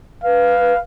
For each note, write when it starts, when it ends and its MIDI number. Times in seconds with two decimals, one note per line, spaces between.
0.24 0.78 71
0.24 0.80 77